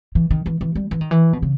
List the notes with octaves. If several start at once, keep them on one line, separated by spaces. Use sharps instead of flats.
E3
D#3
E3
E3
G3
E3
D#3
E3
B2
C#3